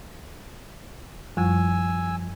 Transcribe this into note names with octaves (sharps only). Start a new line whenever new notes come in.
F#2 F3 G3 G#5 E6